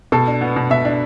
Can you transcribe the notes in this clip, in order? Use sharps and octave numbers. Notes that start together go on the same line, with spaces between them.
B2 A4
D4
B3
B2
B2 E5
D4